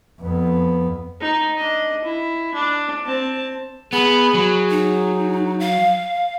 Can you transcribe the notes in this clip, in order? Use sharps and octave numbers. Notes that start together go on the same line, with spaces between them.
F2 B3
D#4
D4 D#5
E4
D4
C4 A5
B3 G#4 B5
F#3
D#4
F5